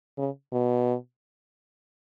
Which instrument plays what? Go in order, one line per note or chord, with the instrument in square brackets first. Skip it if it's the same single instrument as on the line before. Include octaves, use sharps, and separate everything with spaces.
[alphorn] C#3
B2